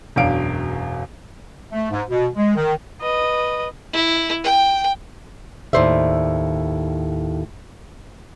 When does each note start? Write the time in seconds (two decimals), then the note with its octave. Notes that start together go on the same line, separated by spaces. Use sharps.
0.16 E1 F#2 D4 F5 D7
1.72 A3
1.91 G#2
2.10 B2
2.35 G#3
2.56 D#3
3.02 B4 D#5
3.93 E4
4.44 G5
5.73 D#2 A2 C5 D5 E5